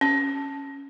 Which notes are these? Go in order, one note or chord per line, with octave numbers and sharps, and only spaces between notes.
C#4